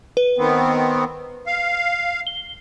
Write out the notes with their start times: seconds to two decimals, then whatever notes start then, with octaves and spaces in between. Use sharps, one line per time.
0.17 B4
0.38 D#3 B3 C4
1.47 F5
2.27 G7